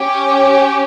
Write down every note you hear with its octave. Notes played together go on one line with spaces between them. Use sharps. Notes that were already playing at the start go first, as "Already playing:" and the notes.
Already playing: C#4 G4